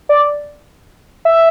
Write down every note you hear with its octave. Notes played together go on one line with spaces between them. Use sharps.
D5
E5